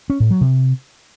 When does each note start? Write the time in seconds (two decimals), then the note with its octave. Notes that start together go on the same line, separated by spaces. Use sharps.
0.10 C#4
0.20 A2
0.31 F#3
0.41 C3